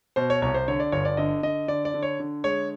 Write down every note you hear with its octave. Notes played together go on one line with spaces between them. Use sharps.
B2 C5
C#5
C2 C#5
C5
D3 C#5
D5
G1 C#5
D5
D3 D#5
D3 D#5
D3 D5
D5
D3
C#5
D3
G#3 C#5